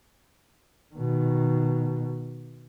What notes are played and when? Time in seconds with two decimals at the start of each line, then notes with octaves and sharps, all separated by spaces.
0.95 B2 D#3